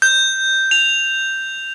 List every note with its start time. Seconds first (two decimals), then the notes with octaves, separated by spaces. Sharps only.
0.02 G6
0.71 F7